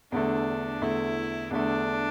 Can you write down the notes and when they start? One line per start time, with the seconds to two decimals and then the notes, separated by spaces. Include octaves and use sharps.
0.12 E2 D3 A3 D4
0.82 E2 D3 A3 E4
1.50 E2 D3 A3 D4